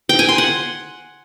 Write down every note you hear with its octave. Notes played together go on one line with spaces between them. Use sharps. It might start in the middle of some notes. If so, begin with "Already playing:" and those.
G5
G#5
C6
F#5